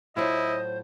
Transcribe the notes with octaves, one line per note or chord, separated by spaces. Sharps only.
A2 F#3 E4 F4 C5 D#5